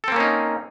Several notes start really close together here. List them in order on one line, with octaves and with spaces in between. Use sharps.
A4 C4 A#3 C#4 D#4